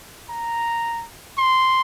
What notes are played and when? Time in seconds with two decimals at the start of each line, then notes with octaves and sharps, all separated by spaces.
0.30 A#5
1.38 C6